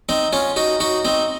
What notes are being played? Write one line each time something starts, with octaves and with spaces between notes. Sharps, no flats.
C4 D#4
C#4 F4
D#4 F#4
D#4 F#4
C4 D#4